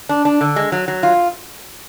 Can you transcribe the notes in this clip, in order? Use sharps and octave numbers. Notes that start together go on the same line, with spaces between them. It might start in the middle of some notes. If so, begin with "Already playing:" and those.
D4
D4
D3
G#3
F#3
F#3
F4